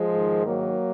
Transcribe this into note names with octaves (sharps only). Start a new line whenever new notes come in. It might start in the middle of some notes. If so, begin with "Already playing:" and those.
Already playing: F3 G#3
G#2 D#3
F#3 A#3